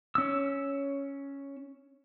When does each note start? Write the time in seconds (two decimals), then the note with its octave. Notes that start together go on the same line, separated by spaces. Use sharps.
0.15 C#4 E6